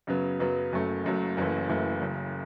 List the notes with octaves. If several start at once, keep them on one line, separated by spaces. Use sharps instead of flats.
F#2 C#3 F#3 B3
F#2 C#3 F#3 B3
F#1 F#2 F#3 A3
F#1 F#2 F#3 A3
F#1 F#2 E3 A3
F#1 F#2 E3 A3
F#1 F#2 C#3